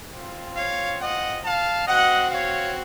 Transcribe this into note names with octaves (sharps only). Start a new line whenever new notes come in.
C4 F4
C#5 F5
D#5 F#5
F5 A5
C4 F#4 D#5 F#5
C#5 F5